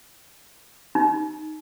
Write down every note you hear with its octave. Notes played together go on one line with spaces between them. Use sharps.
D#4